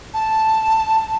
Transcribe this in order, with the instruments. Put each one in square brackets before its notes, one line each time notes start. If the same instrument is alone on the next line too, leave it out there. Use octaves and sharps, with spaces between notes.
[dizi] A5